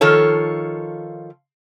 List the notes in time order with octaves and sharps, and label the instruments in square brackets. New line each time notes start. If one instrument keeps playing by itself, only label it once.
[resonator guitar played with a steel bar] D#3 F3 F4 A4 C#5